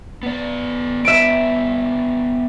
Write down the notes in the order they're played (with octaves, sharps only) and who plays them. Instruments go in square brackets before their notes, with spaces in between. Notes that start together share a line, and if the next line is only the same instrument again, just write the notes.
[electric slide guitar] B3 D5
[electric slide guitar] B3 D4 [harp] E5 D7